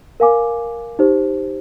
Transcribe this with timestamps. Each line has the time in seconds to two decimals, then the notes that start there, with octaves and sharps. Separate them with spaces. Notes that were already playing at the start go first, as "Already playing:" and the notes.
0.20 A#4 F5 G#5 D6
0.99 D#4 G4 C5